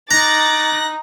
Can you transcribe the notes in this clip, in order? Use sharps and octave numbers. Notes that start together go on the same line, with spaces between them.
D#4 A#5 D6 F#6 A6 A#6